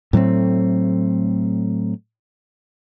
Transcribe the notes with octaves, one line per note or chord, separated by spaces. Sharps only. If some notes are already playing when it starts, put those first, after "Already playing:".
A2 F#3 A3 C4